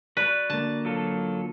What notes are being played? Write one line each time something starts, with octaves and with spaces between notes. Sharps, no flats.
F#4 B4 D5
D3 A#3 A5
F#3 F4 A4